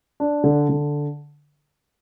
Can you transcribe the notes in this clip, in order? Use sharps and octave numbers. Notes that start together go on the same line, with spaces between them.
D4
D3
D3